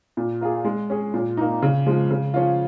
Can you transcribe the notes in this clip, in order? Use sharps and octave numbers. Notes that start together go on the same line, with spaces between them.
A#2
A#3 F4 G#4
G#3
C#4 G#4
A#2
A#3 D#4
C#3
F3 G#3
C#3
F3 C#4 F4